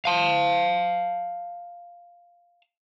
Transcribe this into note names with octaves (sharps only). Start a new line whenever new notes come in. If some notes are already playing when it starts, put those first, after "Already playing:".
F5 A5